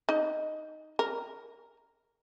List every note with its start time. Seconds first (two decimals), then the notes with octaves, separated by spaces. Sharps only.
0.09 D#4 D#5
0.99 A#4